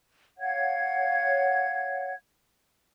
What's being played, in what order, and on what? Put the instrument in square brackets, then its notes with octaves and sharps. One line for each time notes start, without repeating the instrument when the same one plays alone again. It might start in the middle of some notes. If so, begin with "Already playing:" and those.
[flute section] C#5 F5 F#5 G#6